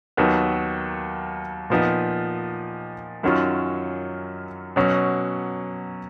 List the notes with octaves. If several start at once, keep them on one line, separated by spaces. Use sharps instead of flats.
D#2 D#3 F#3 B3
A#2 F3 B3 D#4
F#2 D#3 F#3 C#4 F4
B2 F#3 C#4